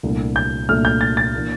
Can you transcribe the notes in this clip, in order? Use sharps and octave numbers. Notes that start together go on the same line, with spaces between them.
C2 A#2 A3 D4
G6
C2 A#2 A3 D4 F6
G6
A6
A6
E3 A#3 D4